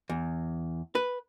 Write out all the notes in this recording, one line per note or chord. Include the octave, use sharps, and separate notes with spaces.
E2
B4